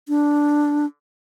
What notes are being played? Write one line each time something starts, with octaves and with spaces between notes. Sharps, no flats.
D4